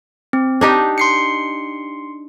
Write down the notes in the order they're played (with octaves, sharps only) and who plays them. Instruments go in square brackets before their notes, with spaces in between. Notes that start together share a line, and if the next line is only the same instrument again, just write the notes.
[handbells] C4
[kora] D4 D#4 G4
[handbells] C6 C7 C#7